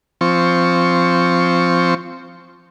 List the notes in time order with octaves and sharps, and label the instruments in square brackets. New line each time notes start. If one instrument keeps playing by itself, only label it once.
[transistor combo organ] F3 C4 C#6